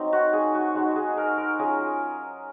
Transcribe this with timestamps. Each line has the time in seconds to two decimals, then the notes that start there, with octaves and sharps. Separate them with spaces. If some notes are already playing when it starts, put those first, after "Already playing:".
Already playing: F#3 C4 D#4
0.13 F#4
0.33 G#4
0.55 F#4
0.75 G#3 D#4 F#4
0.96 G#4
1.17 A#4
1.38 A#4
1.59 F#3 C#4 F4 G#4